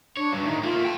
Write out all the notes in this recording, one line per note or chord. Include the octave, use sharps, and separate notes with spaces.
D4 C#5
G2 F#3
A2 D#3 D#4
A3 A#3 F4
G5 A5